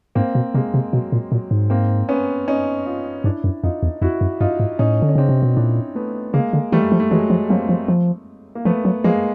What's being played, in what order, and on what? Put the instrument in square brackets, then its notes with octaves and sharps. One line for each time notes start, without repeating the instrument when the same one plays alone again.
[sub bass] G#2 [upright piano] A#3 C4
[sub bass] B2
[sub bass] C3 [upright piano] G#3 A#3
[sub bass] C3
[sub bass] B2 [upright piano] F#3
[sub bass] A#2
[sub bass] A#2 [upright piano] F#3
[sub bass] G#2
[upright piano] A#3 C4
B3 C#4
C#4 D#4
D#4 F4
[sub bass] G2 [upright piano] D4 E4
[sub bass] F#2
[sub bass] F2 [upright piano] D#4 F4
[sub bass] E2
[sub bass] F2 [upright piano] E4 F#4
[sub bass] F#2
[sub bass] G2 [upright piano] D#4 F4
[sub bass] G#2
[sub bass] A2 [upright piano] C#4 D#4
[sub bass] D3
[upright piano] C#4
[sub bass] C#3 [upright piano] C4 D4
[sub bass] C3
B2
[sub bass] A#2 [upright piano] D4 E4
[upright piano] A3 B3
[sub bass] C#3 [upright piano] G#3 A#3
[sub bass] D3
[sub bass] E3 [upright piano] G3 A3
[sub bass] F3
[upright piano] A3
[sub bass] E3 [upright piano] F#3 G#3
[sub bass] F3
[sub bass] F#3 [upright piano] A#3 C4
[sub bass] F3
F3
[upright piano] A#3
[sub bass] F3 [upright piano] A3 B3
[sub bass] F#3
[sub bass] F3 [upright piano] G#3 A#3